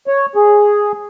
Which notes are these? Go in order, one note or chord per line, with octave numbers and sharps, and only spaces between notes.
C#5
G#4